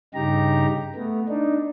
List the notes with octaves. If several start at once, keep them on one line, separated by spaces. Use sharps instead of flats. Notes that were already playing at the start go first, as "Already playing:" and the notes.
G2 C#3 D#4 G4 A#5
A3 B3
D4 D#4